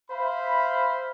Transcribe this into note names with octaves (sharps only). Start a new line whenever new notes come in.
C5 E5 F5 B5